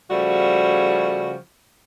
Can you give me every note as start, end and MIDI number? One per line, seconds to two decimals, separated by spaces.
0.10 1.34 49
0.10 1.34 53
0.10 1.34 55
0.10 1.34 57
0.10 1.34 66